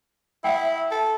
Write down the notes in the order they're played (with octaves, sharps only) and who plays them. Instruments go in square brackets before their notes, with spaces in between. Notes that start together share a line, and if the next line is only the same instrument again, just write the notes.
[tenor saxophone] E4 [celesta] E5 F#5 G5
[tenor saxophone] A4